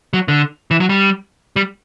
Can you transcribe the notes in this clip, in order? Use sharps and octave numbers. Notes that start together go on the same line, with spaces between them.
F#3
D3
E3
F#3
G3
G3